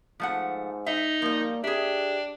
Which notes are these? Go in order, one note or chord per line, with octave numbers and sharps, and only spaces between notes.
G#2 F3 A3 F#5
D#4 E5
F3 G3 A#3
D4 G4 G#4 E5